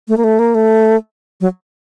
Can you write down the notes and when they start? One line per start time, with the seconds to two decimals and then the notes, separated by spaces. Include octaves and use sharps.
0.08 A3
0.17 A#3
0.24 A3
0.39 A#3
0.55 A3
1.41 F#3